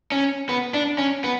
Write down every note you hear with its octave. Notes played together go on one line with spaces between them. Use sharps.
C#4
B3
D4
C#4
B3